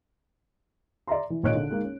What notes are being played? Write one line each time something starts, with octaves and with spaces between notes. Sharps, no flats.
D5 E5 A#5 C6
E3
G#1 A#2 C#5 D#5 F#6 D7
D3
G#3 A#3 D#4
C#4